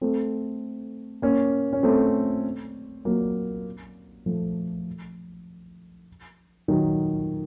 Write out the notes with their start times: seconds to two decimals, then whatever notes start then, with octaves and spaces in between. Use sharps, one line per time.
0.01 A3 C4
1.22 A#3 C#4
1.73 C#4
1.83 A3 C4
3.05 F#3 A#3
4.26 F3 A3
6.68 D#3 F#3